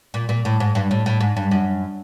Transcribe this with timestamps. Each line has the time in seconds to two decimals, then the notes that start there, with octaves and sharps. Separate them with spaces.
0.14 A#2
0.29 A#2
0.45 A2
0.60 G#2
0.75 G2
0.91 A2
1.06 A2
1.21 G#2
1.37 G2
1.51 F#2